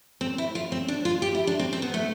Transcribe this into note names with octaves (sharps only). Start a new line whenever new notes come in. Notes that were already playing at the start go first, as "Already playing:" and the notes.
C4
E4
F4
C4
D4
F4
G4
E4
D4
C4
C4
B3
A3